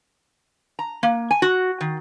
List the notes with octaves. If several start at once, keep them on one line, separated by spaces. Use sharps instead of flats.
A#5
A#3
G#5
F#4
D#3